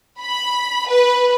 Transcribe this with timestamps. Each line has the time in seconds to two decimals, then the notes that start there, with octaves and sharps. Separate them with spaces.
0.21 B5
0.89 B4